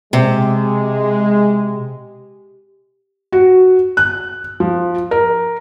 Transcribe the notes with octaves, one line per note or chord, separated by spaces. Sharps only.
C3 G#3
F#4
F#6
F3
A#4